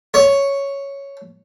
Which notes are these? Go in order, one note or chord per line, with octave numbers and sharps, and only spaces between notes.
C#5